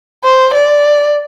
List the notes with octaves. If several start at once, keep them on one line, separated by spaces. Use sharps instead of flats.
C5
D5